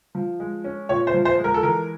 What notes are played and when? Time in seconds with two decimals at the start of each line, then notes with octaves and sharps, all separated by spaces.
0.15 F3
0.40 G#3
0.64 C#4
0.89 A#2 C#5
1.07 C5
1.14 F3
1.25 C5
1.38 G#3
1.44 A#4
1.54 A4
1.63 E3 A#4